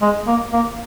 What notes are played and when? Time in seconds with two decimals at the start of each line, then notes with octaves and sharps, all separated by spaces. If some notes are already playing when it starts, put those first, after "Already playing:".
0.01 G#3
0.27 A#3
0.53 A#3